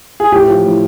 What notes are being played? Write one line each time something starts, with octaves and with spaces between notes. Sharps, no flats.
G#4
A2 G4
F3
A2